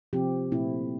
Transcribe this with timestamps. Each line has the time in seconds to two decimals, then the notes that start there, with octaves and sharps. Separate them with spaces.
0.13 C3 F3 C4 G4
0.52 A#2 A3 C4 E4